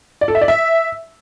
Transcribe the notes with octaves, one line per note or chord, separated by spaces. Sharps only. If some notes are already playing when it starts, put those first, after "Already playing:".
D5
A4
E5
D5
E5